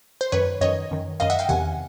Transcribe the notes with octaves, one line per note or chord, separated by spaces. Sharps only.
C5
F#2 D#3 B4 C#5
F#2 D#3 C#5 D#5
F#2 D#3
F#2 D#3 D#5 F5
E5 F#5
F5 G5
E2 C3 D#3 F#5 G#5